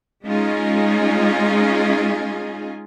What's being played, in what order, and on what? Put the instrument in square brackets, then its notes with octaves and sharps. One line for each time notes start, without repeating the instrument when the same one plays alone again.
[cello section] G#3 C#4 D#4 F4 G#4